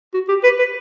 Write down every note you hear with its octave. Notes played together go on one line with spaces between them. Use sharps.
F#4
G4
B4
B4